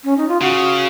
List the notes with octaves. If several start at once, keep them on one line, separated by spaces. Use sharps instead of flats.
C#4
D#4
F4
C#3 F#4